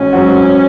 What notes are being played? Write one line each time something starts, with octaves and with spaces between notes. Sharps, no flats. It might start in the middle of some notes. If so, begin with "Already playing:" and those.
Already playing: A1 G#2 C4 C#4 F#4
G#2 F#3 C4 F#4